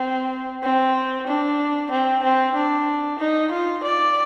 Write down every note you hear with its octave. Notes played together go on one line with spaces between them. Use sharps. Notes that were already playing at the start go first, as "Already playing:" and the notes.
Already playing: C4
C4
D4
C4
C4
D4
D#4
F4
D5